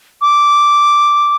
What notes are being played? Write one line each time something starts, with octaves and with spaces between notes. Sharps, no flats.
D6